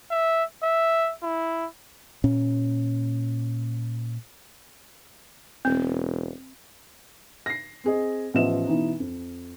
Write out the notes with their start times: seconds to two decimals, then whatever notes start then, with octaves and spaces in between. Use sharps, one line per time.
0.11 E5
0.63 E5
1.23 E4
2.24 A#2 C#4
5.65 E1 C4
7.46 A#6 C7
7.84 C4 G#4 D#5
8.34 A1 F3 B3 D#5 E5 E7
8.67 B2 E3 D#4
9.00 F2